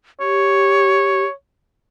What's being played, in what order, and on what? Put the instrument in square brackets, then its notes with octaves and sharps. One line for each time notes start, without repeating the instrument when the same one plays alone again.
[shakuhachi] G4 [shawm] C#5